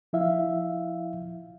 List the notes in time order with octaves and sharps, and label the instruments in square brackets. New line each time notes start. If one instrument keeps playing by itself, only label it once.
[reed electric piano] F3 E4 E5 F5